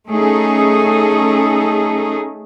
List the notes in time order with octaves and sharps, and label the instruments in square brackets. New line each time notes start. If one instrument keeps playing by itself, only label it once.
[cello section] A3 C#4 D#4 G#4 A4